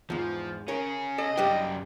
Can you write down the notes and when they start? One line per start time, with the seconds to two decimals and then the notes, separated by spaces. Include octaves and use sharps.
0.10 E2 G#2 F3
0.68 C#4 G#4 A#4 C#5
1.18 A4 D#5
1.37 F#2 G3 D4 G4 G5